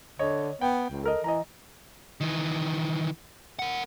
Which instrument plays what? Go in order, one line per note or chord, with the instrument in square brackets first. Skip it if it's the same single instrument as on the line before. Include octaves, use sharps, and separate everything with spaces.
[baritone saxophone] D3 [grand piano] C#5 D#5
[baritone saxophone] B3 [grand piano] G5
[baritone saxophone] C#2
[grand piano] A4 A#4 D#5
[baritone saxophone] E3 [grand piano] D#5 A#5
[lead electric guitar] D#3 E3
A#4 F#5